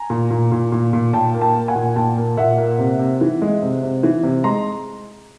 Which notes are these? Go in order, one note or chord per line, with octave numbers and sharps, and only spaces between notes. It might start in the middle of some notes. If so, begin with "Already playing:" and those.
Already playing: G#5 A#5
A#2
A#2
A#2
A#2
A#2
A#2 G5 A5
A#3
G5 A5
A#3
F#5 G#5
A#2
A#2 G5 A5
A#3
A#2 E5 F#5
A#3
C3
C3
E3
G#3
C3
C3
E3
C3
G#3 A#5 C6